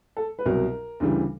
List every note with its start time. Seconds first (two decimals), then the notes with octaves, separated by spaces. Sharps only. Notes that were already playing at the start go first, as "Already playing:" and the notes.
0.17 A4
0.39 B4
0.46 C2 B2 F#3 A#4
1.00 D2 C#3 E3 G3